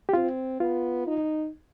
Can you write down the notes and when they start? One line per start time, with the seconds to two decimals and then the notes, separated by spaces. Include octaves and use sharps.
0.09 G4
0.13 C4 F4
0.60 B3 F4
1.07 D#4